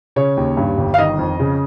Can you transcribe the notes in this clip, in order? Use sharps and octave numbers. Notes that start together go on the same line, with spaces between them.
C#3 C#5
D#2
G2
G1
F5
D#3 D#5
F2
C#3